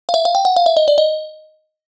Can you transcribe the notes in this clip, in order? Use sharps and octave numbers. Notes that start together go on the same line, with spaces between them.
F5
E5
F5
G5
F#5
F5
E5
D#5
D5
D#5